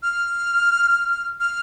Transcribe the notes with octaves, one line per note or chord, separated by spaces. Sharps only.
F6
F6